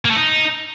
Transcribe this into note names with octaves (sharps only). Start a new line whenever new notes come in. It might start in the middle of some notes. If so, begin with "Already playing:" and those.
A#3
A3
D#4